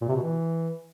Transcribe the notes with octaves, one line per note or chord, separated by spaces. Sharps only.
A#2
C3
B2
E3